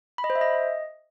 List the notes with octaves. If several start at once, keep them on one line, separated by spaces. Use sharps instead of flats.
B5
D#5
C5
E5
D#5